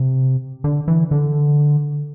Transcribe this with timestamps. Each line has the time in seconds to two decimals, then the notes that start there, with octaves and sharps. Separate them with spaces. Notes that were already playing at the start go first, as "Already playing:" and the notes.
Already playing: C3
0.64 D3
0.88 E3
1.11 D3